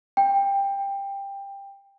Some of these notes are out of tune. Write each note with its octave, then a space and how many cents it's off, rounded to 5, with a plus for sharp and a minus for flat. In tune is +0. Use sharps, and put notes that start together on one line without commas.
G5 +15